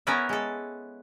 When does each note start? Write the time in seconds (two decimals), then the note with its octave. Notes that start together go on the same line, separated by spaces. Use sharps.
0.07 B3 C#4 E4 A#4 B4 E5
0.29 G#3 A4